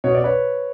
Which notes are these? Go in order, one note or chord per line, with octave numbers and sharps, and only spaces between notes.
B2 C#5
D5
B4 C#5